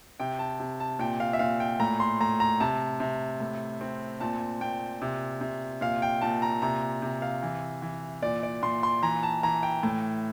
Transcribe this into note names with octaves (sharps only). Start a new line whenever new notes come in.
C3 G5
A5
C3
A5
A#2 G5
F5
E5
A#2 F5
G5
A2 A#5
C6
A2 A#5
A#5
C3 A5
C3
A2
C4
A#2 A5
A#2 G5
C3
C3
A#2 F5
G5
A#2 A5
A#5
C3 A#5
C3
F5
E3
E3
A#2 D5
D5
A#2 C6
C6
E3 A#5
A5
E3 A#5
G5
A2